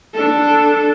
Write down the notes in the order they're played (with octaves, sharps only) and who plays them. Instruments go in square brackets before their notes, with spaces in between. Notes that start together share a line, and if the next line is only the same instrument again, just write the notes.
[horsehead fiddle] D4 A4